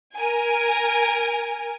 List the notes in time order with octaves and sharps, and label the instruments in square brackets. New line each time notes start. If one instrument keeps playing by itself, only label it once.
[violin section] A#4 G#5